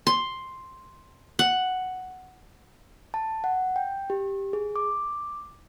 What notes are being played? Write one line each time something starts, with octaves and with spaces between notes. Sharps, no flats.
C6
F#5
A5
F#5
G5
G4
G#4
D6